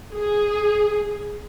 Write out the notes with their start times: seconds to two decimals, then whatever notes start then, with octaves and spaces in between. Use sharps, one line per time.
0.14 G#4